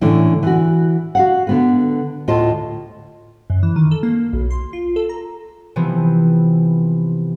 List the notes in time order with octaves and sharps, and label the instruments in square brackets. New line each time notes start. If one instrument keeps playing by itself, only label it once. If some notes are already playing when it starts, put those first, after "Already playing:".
[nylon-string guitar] A2 D3 E3 C#4 E4
E3 F#4
F#4 F5 F#5
D3 B3 B4
D2 A2 F4 D#5 A5
[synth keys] F#2
E3
D#3
A4
A#3
B1
C6
F4
A4
A#5
[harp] C3 E3 F3 B3 C4